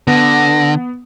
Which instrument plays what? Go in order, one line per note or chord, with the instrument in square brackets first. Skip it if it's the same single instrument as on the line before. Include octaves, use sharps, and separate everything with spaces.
[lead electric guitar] D3 [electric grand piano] B3 [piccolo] A#6